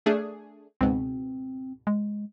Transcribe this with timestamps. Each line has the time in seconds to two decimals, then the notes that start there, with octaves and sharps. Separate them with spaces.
0.06 A3 D4 G#4
0.81 C#2 G#2 B2 C4
1.87 G#3